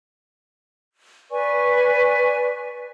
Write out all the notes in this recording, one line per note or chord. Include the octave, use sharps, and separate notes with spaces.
B4 D5 G#5 C#6